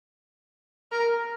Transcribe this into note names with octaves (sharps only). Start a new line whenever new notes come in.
A#4